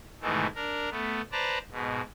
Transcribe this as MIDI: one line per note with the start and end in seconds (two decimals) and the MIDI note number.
0.21 0.47 44
0.21 0.47 47
0.21 0.47 51
0.21 0.47 52
0.21 0.47 57
0.55 0.89 62
0.55 0.89 70
0.91 1.21 57
0.91 1.21 59
1.32 1.58 71
1.32 1.58 72
1.32 1.58 74
1.32 1.58 81
1.32 1.58 82
1.72 2.01 44
1.72 2.01 47